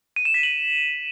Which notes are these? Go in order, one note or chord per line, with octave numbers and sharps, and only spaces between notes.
D#7
E7
B6
F#7